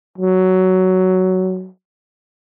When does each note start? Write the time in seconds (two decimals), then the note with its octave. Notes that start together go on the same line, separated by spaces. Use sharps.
0.18 F#3